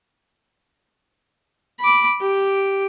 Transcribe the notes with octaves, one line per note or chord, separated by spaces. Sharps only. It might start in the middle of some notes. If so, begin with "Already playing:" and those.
B5 D6
G4